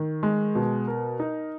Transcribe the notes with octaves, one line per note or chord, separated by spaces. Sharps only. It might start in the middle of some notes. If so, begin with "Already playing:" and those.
Already playing: D#3
G#3
B2
A#4
D#4